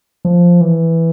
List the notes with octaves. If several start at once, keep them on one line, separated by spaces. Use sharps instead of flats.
F3
E3